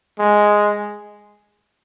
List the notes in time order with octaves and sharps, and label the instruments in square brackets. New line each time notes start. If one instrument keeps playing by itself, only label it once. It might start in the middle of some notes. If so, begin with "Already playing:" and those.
[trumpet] G#3